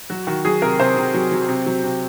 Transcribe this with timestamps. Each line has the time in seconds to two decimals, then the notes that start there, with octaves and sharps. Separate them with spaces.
0.10 F#3 F#4
0.27 D#3 F#4
0.45 F#3 G#4
0.62 C3 A#4
0.80 C3 C5
0.97 C3
1.14 F#3
1.32 F#3
1.49 C3
1.66 F#3
1.84 C3